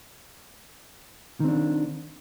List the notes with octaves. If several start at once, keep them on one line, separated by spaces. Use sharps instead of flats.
D#3 C4 D4